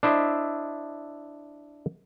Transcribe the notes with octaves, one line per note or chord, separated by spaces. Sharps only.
D4 E4 C5 D#5 E5